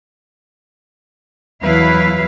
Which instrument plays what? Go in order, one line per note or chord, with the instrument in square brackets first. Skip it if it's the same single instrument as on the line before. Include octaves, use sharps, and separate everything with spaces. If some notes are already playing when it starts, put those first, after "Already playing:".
[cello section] E2 F#3 E4 B4 F5